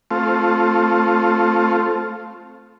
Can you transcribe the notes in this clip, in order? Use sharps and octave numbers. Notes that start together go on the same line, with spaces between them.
A3 C4 F4